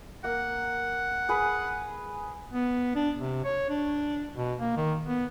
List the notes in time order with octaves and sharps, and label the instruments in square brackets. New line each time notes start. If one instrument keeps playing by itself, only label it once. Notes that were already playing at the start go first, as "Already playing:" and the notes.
[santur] A#3 [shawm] F#5
[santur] G#4 B4 B5
[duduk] B3
D4
C3
C#5
D4
B2
A#3
D#3
B3